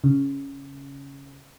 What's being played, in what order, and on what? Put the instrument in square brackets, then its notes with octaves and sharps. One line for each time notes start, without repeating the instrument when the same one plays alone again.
[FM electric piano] C#3